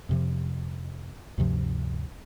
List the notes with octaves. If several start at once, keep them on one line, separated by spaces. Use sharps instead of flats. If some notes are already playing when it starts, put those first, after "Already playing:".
F2 C3 F3
D2 G2 C3 F3